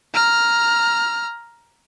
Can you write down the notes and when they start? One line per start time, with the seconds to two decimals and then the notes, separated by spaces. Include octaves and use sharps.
0.14 A#5 F6